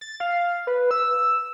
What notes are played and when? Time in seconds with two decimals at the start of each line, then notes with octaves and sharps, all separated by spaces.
0.01 A6
0.20 F5
0.67 B4
0.91 E6